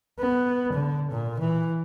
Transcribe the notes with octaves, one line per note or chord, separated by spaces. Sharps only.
B3
D3
A#2
E3